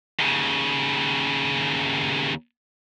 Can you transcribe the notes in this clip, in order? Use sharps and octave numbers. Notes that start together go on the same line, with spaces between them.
D#2 C#3